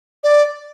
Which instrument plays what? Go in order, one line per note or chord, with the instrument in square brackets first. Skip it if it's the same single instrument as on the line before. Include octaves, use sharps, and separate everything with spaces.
[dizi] D5